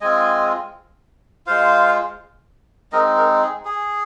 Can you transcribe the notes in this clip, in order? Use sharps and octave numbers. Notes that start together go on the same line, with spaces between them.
G#3 C4 F4 D#5 G#5
G#3 F4 C5 F5
G#3 C4 D#4 A#4 D#5
A#4
G#4
G#4